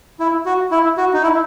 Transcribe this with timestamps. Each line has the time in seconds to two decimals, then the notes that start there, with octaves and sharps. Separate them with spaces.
0.20 E4
0.46 F#4
0.71 E4
0.97 F#4
1.14 D#4
1.23 E4